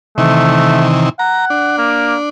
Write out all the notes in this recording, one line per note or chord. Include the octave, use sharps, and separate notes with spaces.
C3 D#3 E3 A3
F#5 A#5
D4
A#3